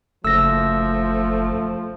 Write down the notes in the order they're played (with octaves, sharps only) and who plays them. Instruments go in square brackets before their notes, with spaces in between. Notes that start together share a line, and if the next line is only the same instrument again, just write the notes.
[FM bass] F#1 [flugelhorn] F3 [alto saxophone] A3 [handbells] E6 A#6